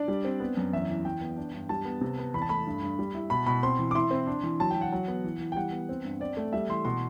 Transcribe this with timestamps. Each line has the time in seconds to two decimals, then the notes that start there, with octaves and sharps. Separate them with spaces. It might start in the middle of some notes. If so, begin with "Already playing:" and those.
Already playing: D4 D5
0.08 G3
0.25 C4
0.40 B3
0.57 F#2
0.73 E2 E5
0.90 E3
1.05 E3 G5
1.21 B3
1.37 D4
1.54 G2
1.69 G3 A5
1.85 B3
2.01 C3
2.18 B3
2.34 E2 B5
2.42 A5
2.49 A3 B5
2.66 G2
2.82 G2
2.99 G3
3.15 E4
3.30 B2 B5
3.46 B2 B5
3.63 C4 C6
3.79 E3
3.91 D6
3.95 E4 C6
4.11 C4
4.27 D4
4.43 E3
4.60 F#3 A5
4.71 G5
4.75 F#3
4.81 F#5
4.92 F#3
5.08 B3
5.24 E3
5.40 E3
5.52 G5
5.56 G3 F#5
5.72 B3
5.89 C4
6.05 G2
6.20 C4 D5
6.37 A3
6.53 G3 E5
6.69 E3 C6
6.85 B2 C6